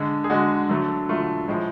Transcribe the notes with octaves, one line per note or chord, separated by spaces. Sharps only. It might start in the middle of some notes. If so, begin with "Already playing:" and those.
Already playing: D3 G#3
G#4
D3 G#3 F#4
D3 F#3 A3
D3 F#3 A3 F4
A2 F3 G#3